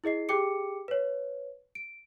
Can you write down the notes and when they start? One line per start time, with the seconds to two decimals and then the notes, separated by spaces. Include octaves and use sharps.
0.04 E4 G#4 D#5 C7
0.29 G4 G#4 G5 D6 C#7
0.88 B4 C#5
1.75 D7